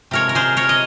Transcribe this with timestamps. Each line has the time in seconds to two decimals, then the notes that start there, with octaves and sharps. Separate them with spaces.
0.11 C3 F3 G#3 A#4 C#5
0.29 A#4
0.35 G#4 C5
0.57 A#4 C#5
0.69 D#5